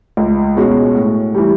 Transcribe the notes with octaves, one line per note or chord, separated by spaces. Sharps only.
C#2
B2 G#3 C#4 F#4
A2
E3 G3